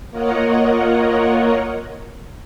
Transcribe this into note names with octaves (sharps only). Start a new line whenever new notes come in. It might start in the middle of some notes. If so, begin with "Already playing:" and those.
A#3 F4 A#4 C#5 D#5 F#5